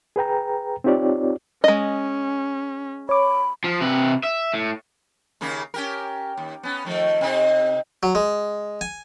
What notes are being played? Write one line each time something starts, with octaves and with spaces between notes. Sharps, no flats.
G#4 B4 G5 A#5
C4 D#4 F4 G4 C#5 D5
G#3 C#4 D#5
C#5 B5 D6
F3
C3 B4
E5
A2
D#2 C#3 A#3
C#4 G4 A#4
D#2
B3 C#4
D#3 F3 A3
C3 C4 D#4
F#3
G#3
G#5